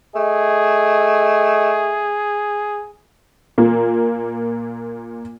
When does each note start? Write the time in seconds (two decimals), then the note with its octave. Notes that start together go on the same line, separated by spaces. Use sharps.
0.15 A3 G#4 D#5
3.58 A#2 A#3